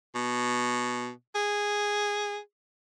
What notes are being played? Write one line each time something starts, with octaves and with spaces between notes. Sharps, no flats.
B2
G#4